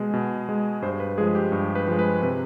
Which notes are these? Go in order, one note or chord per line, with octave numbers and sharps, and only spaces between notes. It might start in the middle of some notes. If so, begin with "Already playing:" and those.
Already playing: B2 G#3
B2
G#3
G2 C5
B4
F3 G#3 G#4
G4
G2
B4
F3 G#3
B4
C3 B4